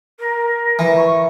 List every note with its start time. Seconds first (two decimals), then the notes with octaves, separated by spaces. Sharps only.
0.19 A#4
0.79 E3
0.97 C#6